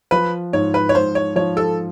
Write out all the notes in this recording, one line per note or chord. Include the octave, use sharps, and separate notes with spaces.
F3 B4
G#2 C#5
B4
C#5
G#2 C5
C#5
F3 C#5
A4